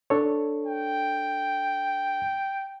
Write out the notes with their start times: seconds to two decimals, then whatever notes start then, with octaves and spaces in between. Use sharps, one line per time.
0.10 D4 A4 C#5
0.67 G5